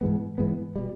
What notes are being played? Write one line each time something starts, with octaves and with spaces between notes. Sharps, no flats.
G#2 E3 G#3 B3
G#2 E3 G#3 B3
B2 G3